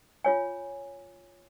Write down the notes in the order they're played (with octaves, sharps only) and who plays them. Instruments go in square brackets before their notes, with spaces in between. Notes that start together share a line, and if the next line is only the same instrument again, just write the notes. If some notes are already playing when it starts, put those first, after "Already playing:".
[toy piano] F4 C#5 G#5